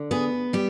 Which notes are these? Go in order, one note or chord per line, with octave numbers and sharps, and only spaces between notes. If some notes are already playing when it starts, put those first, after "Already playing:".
Already playing: D3
B3 G#4
G3 G4